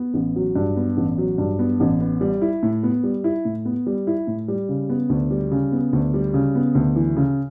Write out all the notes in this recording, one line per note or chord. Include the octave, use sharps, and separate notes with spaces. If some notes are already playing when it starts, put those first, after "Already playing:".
Already playing: B3
A1
F#3
G2
B3
A1
F#3
G2
B3
A1
B3
G3
E4
A2
B3
G3
E4
A2
B3
G3
E4
A2
G3
C#3
B3
D2
G3
C#3
B3
D2
G3
C#3
B3
D2
E3
C#3